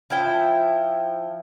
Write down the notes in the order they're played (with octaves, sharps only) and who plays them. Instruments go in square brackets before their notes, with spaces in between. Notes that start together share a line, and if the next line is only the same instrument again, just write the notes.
[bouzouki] F3 E4 G5